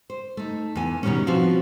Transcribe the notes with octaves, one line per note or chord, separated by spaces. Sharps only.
C5
A3 D#4
E2 G#5
B2 D#3 F#3 G3 A#3 C#4
F3 C4 F#4 B4 F5